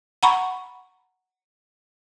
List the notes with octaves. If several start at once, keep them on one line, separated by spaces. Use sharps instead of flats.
F#5 A#5 B5 C#6